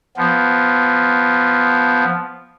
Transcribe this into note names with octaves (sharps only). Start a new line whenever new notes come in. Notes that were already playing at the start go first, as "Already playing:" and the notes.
F3 B3